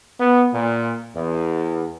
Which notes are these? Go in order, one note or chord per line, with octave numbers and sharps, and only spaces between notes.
B3
A#2
E2